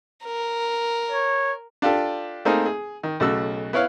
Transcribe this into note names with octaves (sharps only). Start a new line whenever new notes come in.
A#4
C#5
D4 F4 G4 A4
A3 A#3 C4 D#4 G#4
G#4
D#3
B1 C#3 A3 F#4 E6
B3 E4 C#5 F5